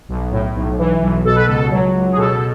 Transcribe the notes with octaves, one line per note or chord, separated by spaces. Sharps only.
B1
A2
B1
E3
B1
B2 A4
B4
C#2 A4
F#3
C#2
G#4
B2 A4